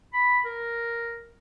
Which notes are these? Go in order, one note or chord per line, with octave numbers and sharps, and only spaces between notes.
B5
A#4